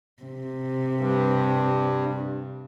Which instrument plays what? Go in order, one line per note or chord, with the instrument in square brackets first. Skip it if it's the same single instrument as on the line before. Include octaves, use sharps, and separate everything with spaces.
[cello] C3
[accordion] G2